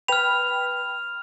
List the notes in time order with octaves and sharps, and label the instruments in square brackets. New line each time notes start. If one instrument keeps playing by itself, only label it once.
[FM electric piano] B4 G5 B5 [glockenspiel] F6 F7